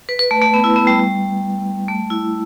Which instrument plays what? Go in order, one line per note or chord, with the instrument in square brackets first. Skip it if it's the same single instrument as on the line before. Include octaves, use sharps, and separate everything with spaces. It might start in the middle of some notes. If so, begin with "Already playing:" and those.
[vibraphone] B4
B4
A3
A3
B3
E4
B3
G3
A3
E4